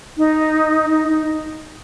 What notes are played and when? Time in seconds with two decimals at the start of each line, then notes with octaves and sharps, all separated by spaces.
0.17 D#4
0.90 D#4
1.08 D#4